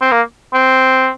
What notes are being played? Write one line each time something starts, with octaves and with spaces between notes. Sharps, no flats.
C4
A#3
C4